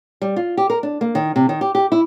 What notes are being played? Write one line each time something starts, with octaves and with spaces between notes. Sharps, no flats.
G3
F4
G4
A#4
D4
A#3
D#3
C3
D#3
G4
G4
E4